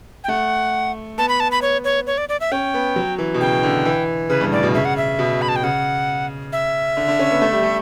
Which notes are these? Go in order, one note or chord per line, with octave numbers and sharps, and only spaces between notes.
G5
A3 F#5
B3 A5
B5
A5
B5
C#5
C#5
C#5
D5
D5
E5
C#4 G5
B3
F#3
E3
B2
C#3 G5
D3
E3
C#3 B4
G2
A2 D5
B2
C#3 E5
F#5
E5
B2
B5
A5
G5
C#3 F#5
E5
D3
D3
C#4
B3
A3
G3
A3